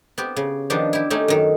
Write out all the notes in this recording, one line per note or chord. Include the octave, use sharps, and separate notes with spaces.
B3 C4 G4
C#3
D#3 F3 B3 D4 G4
E4 G4
A3 C#4 D#4 G4
F#2 D#3